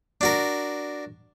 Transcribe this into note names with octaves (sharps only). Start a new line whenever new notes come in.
D4 F#4 A#4